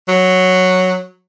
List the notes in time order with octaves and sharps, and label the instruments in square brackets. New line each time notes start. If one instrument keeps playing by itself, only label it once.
[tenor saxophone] F#3